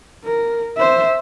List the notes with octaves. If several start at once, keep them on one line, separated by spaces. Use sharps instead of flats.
A#4
C5 E5